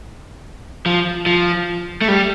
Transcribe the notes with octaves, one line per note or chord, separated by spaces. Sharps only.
F3
F3
A3
G3